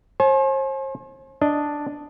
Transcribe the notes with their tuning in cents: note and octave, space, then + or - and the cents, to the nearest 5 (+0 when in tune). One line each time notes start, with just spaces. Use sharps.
C5 +45 G#5 +40
D4 +0 D#5 +0